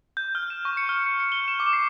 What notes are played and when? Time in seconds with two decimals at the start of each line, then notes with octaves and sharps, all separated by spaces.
0.17 G6
0.35 F6
0.50 E7
0.65 C#6
0.77 C#7
0.89 F6
1.06 C#7
1.20 C#7
1.32 G7
1.48 E7
1.60 D6
1.73 C7